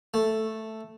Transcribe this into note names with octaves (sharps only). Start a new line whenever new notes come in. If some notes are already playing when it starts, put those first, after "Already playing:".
A3